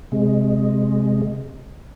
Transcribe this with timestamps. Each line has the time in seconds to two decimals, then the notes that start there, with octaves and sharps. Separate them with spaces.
0.12 C3 G#3